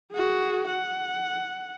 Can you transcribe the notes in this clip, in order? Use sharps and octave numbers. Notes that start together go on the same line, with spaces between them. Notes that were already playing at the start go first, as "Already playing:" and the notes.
F#4 G#4
F#5